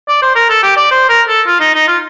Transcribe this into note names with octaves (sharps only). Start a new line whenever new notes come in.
D5
C5
A#4
A4
G4
D5
C5
A#4
A4
F4
D#4
D#4
F4